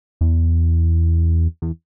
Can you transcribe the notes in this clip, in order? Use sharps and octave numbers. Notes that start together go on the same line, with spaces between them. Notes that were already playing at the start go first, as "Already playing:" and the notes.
E2
E2